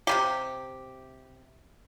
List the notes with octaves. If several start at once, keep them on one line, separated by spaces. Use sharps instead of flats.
C3 D#3 G4